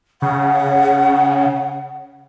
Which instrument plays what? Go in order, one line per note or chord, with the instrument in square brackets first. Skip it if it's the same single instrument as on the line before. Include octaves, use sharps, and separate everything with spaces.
[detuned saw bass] C#3 [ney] F#5